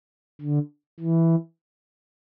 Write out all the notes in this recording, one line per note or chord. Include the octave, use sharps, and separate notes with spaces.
D3
E3